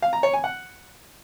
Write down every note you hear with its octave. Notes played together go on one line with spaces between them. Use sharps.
F5
A#5
C#5
G#5
F#5